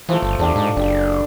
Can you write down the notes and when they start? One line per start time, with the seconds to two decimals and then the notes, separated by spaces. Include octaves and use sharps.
0.09 E3 F3 A3
0.22 G1
0.39 E2 A3 D4 G4
0.56 G#2
0.77 F#1 D4 G4